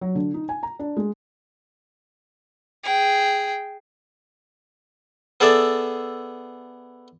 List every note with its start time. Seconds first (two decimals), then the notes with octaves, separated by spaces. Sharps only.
0.01 F#3
0.15 D3
0.34 D#4
0.49 G#5
0.63 A#5
0.79 D4
0.97 G#3
2.84 G#4 G5
5.40 B3 G#4 A4 D5 E5